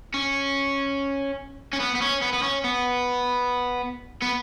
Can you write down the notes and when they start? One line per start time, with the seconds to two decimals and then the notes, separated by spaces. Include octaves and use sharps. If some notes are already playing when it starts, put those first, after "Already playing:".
0.14 C#4
1.73 C#4
1.80 B3
1.95 B3
2.02 C#4
2.22 B3
2.33 B3
2.43 C#4
2.64 B3
4.22 B3